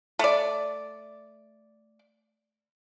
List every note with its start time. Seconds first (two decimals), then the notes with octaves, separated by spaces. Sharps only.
0.19 A3 D5